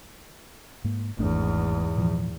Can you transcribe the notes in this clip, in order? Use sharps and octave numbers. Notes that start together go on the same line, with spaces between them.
G#2 A#3
G#1 E2 G#2 A3 D4
A#2 E3 F3